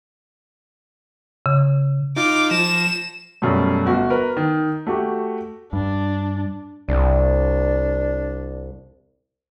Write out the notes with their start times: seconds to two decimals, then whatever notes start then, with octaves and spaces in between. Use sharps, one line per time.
1.46 C#3
2.16 D#4 F4 F5 D6
2.51 F3 A#6 E7
3.42 F#2 B2 G3 A3
3.86 G1 F#4
4.10 A#4 B4
4.37 D#3
4.87 A3 F#4 G4
5.73 G2 D4
6.89 C2 D4